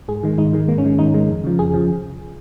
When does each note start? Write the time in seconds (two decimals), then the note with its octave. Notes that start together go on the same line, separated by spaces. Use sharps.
0.08 G#2 G#4
0.23 D#3 G#3
0.38 G#2 D#4
0.53 D#3 G#3
0.68 G#2 A#3
0.78 C#4
0.84 D#3 G#3
0.98 G#2 D#4
1.14 D#3 G#3
1.29 F2
1.44 C#3 F3
1.59 F2 G#4
1.74 C#3 F3